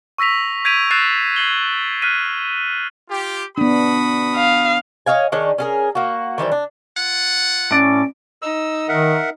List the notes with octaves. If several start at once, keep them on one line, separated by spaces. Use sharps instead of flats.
C#6 E6 A#6 B6 F7
G6 G#6 B6 D7 D#7 F7
E6 F#6 A6 C7 D#7 E7
G#6 C7 F#7 G7
F6 F#6 B6 D#7
F4 G4
B3 D4 F#4 B5 D#6
F5
C#5 D#5 F5 G#5
D#3 D4 G#4 C#5
C#4 G#4 A#4
A#3 F#4
D#3 E3 G3 C5
D4
F4 F#5
A2 C#4 D5
D#4 E6
D#3 A#4 E5 F#5